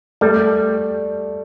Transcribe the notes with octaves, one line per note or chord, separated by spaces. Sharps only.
G3 A3